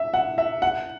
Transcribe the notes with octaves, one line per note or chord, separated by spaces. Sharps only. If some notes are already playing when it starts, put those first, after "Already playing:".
Already playing: E5
F#5
E5
F#5